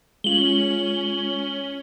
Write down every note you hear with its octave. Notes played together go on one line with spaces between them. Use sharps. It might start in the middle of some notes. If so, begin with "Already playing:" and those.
G#3 C#4 F4 F#7 G7